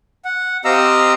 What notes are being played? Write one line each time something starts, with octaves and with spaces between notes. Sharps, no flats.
F#5
C4 G4 D#5 F5 A#5 E6